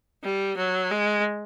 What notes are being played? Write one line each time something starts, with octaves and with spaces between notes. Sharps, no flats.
G3
F#3
G#3